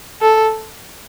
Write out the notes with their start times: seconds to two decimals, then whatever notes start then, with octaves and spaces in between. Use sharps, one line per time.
0.21 A4